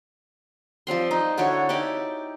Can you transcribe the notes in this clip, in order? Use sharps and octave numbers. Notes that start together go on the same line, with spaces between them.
F3 G3 C4 C6
D#4
D3 E4 F#4 C#5
D#4 E4 G4 D5